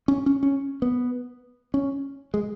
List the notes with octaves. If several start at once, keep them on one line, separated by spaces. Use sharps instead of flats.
C#4
C#4
C#4
B3
C#4
G#3